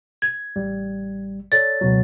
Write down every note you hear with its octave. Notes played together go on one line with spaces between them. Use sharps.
G#6
A1 G3
A4 C#5 D5 A6
C#2 B2 F#3